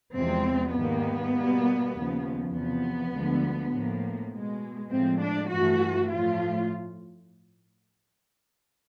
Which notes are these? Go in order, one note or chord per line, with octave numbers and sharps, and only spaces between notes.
E2 C3 F3 G#3 C4
G#2 D#3 G3 A#3 B3
B2 G3 A#3
D#2 C#3 F3
E2 C3 F3 B3
D2 D3 F3 G#3
A2 F3 A#3
B2 G#3
A2 F3 G#3 C4
D4
G2 E3 A3 F#4
A2 F3 A3 F4